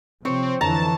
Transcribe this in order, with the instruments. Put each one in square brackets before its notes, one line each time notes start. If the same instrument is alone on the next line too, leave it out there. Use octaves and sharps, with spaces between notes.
[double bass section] C3 F3 [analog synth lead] C4 [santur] C#5
[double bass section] F2 D3 E3 [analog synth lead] A5 [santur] A#5